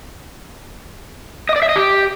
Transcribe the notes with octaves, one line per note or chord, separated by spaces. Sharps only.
D#5
D5
E5
D#5
G4